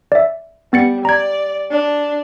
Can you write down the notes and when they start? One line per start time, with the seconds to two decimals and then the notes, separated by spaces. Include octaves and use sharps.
0.12 D5 E5
0.73 G3 B3 A6 C#7
1.05 D5 A#5 G#6
1.71 D4